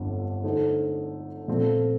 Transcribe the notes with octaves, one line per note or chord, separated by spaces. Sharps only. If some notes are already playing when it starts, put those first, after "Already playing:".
Already playing: G1 F2 D3
D3 A3 D#4 A4 C5
A#2 F3 A3 C4